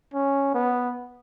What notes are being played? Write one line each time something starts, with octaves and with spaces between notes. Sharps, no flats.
C#4
B3